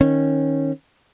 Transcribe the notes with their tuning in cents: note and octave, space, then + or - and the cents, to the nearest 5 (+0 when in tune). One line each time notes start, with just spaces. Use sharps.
D#3 +0 C#4 -20